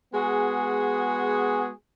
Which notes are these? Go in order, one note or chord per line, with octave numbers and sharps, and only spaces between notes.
G#3 B3 F#4 G#4